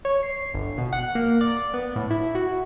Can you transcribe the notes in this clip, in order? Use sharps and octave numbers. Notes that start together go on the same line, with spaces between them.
C#5
C7
G1
B2
F#5
A#3
D5
B3
A2
E4
F#4